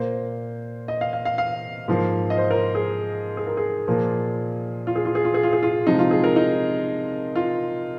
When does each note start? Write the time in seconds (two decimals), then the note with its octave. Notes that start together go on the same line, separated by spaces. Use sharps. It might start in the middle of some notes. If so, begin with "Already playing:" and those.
Already playing: A#2 A#3 C5
0.88 D#5
1.01 F5
1.13 F5
1.25 F5
1.38 F5
1.88 G#2 F3 A#3
2.30 D#5
2.38 C5
2.51 A#4
2.75 G#4
3.37 G#4
3.47 A#4
3.57 G#4
3.88 A#2 F3 A#3
4.87 F4
4.96 G#4
5.05 F4
5.15 G#4
5.25 F4
5.34 G#4
5.43 F4
5.53 G#4
5.63 F4
5.87 C3 F3 G#3 D#4
5.99 F4
6.11 G#4
6.24 A#4
6.36 D#4
7.35 F4